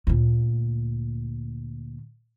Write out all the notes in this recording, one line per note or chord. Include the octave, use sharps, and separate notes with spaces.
D2 A#2